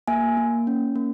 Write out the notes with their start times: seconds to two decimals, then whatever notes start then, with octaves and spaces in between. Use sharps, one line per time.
0.08 A#3 E5 G#5
0.37 A#3
0.67 C#4
0.96 A#3